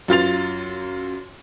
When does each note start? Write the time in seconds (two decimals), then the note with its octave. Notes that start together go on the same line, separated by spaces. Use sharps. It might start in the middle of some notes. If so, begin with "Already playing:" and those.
0.08 F#2 F4 A6 F7